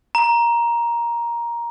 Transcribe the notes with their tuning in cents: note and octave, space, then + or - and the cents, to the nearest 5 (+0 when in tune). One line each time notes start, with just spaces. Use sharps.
A#5 +10